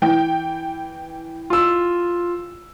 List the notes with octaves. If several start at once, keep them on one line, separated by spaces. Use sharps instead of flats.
E3 G5
F4 E6